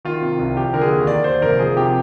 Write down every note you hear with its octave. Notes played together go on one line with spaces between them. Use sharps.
D#3 F4
C3
C2
F3 G4
D3 A#4
G#4
D#2
D#3 D5
D#2 C5
F1 A#4
F3 G#4
C3 G4